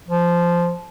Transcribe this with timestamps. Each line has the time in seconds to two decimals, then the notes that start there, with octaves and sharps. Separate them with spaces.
0.08 F3